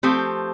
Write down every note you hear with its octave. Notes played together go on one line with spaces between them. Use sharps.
F3 A3 C4 G4